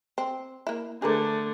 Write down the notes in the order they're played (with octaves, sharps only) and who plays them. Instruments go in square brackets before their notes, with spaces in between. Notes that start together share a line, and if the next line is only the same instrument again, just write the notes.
[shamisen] C4
A#3 E4
[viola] D3 A3 [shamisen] G#4 A#4 B4